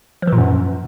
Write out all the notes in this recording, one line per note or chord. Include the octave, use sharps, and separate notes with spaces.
F3
E3
A#2
F#2